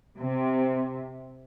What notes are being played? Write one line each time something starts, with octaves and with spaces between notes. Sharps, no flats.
C3